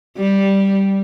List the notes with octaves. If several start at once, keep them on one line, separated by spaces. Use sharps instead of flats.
G3